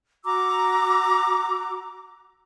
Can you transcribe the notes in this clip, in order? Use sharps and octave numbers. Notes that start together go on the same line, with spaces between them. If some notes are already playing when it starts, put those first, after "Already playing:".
F#4 A#5 D6 E6